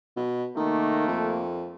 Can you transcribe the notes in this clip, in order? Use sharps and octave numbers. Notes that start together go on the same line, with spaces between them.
B2
C3 D#3 A3 A#3
F2